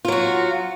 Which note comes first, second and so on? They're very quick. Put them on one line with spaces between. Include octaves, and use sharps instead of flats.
F4 F#3 F#4